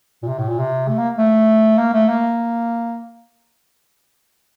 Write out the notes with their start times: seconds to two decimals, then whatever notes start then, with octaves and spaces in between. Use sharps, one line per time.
0.23 A#2
0.28 C3
0.39 A2
0.48 A#2
0.59 C3
0.88 A3
0.98 A#3
1.18 A3
1.78 A#3
1.93 A3
2.09 A#3